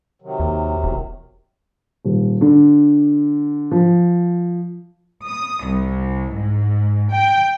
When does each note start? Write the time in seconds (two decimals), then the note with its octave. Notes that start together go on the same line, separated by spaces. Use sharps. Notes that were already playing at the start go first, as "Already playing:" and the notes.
0.22 C3 D#3 F#3
0.40 D#2
0.84 E1
2.05 D#1
2.41 D3
3.71 F3
5.26 D#6
5.66 C2
6.35 G#2
7.12 G5